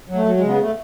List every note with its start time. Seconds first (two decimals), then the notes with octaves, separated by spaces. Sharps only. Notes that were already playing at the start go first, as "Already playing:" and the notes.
0.09 F#3
0.15 A3
0.26 F#3
0.37 G#3
0.42 C#3
0.48 B3
0.60 A3